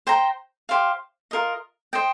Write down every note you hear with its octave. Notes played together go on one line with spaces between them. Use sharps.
C5 G5 A#5
G4 C5 F5
F4 A#4 D#5
C5 D#5 G5